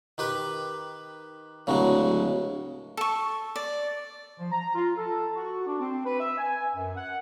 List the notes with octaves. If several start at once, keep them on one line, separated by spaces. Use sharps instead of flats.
D#3 G4 B4
D1 C#3 F#3 G#3
A4 C#6
D5
F3
A#5
F4
A4
F#4
D4
C4
B4
E5
G#5
F#2
F#5